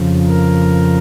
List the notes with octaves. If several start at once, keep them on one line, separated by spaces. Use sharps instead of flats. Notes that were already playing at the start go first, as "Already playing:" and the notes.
Already playing: F2 C#3 F3
A#4